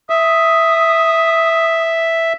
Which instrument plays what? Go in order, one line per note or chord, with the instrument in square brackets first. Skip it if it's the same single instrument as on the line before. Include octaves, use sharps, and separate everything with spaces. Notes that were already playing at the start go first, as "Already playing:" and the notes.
[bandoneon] E5 [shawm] D#6